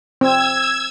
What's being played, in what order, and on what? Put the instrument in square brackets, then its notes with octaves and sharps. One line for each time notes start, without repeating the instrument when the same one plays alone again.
[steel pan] C4 [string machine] E6 G#6